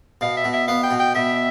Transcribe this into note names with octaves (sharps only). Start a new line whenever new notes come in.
B2 F5
E5
B2
E5
B3 F5
G5
B2
G5
B2 E5